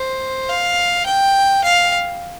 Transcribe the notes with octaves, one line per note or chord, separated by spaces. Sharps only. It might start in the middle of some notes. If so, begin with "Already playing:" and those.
Already playing: C5
F5
G5
F5